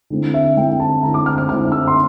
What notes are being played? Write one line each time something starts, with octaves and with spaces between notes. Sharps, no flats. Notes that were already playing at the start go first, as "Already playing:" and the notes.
D3 A3 C4 E4
E5
D3 A3 C4 E4 G5
G5
A5
D3 A3 C4 E4 A#5
D6
F6
F6
D3 A3 C4 E4 F6
E6
C6